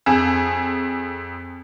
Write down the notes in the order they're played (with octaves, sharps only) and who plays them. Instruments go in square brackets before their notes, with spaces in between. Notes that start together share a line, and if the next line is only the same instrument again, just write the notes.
[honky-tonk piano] F2 G#4